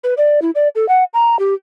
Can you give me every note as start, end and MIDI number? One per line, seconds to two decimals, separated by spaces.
0.04 0.14 71
0.18 0.40 74
0.42 0.51 64
0.55 0.68 74
0.75 0.88 69
0.89 1.04 78
1.14 1.39 82
1.39 1.54 67